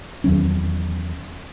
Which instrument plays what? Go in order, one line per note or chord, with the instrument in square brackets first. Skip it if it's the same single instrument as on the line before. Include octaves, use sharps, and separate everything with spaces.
[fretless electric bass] E2 D#3 F#3 C#4